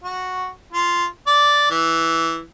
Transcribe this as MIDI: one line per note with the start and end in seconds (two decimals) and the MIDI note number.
0.04 0.49 66
0.72 1.05 65
1.27 1.66 74
1.70 2.40 52